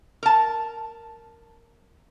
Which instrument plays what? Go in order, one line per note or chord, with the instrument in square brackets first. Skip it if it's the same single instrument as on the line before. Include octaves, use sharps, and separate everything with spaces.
[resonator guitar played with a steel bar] A#4 A5